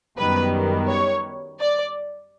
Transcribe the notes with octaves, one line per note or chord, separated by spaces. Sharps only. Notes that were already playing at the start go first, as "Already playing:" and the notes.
F#2 D#3 G3 B3 B4
C#5
D5